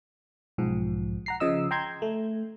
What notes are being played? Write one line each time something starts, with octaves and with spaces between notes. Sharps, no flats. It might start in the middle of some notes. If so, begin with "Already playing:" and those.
B1 G#2 F3
F#5 A#5 C7
C#3 F3 D#5 E6
G5 A#5 C6 G6 G#6
A3